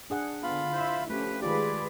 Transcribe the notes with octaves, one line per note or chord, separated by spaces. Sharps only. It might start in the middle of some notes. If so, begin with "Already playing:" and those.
D4 G#4 F#5
D3 B3 F4 F5 B5
E4 C5 E5
F3 A3 C#4 G4 B4
D#3 G#3 F4 G4 G#4 B4 D5